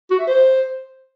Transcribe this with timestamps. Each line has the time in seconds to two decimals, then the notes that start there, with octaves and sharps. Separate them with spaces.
0.11 F#4
0.19 E5
0.27 C5